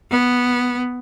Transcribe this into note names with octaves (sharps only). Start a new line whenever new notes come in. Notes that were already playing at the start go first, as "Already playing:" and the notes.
B3